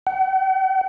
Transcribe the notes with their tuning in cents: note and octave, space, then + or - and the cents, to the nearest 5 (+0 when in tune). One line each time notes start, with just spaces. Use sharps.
F#5 +45